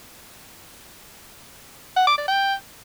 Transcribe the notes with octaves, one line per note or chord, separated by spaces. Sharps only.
F#5
D6
D5
G5